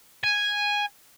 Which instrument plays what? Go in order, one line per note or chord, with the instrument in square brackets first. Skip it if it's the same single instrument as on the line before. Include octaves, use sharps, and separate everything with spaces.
[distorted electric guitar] G#5